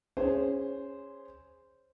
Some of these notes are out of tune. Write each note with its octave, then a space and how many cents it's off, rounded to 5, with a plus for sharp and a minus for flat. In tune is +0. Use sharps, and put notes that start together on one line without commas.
C#4 +0 G#4 -20 C5 -10